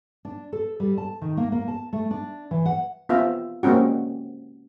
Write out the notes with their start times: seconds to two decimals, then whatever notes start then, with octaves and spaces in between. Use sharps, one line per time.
0.25 D4
0.53 A4
0.80 G3
0.98 A5
1.22 D#3
1.37 A#3
1.52 A#3
1.68 A5
1.93 A3
2.11 D4
2.51 E3
2.66 F#5
3.09 B3 C4 F4 E5 F5
3.63 G#3 A#3 C4 C#4 F#4